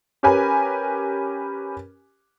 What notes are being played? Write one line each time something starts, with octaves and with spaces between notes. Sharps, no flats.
C#4 G4 A#4 B4 G#5